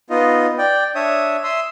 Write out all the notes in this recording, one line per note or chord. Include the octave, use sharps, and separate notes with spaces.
B3 D#4 F4 D#5
D5 G5
D4 C#5 E5 D#6
E5 C6 D#6 E6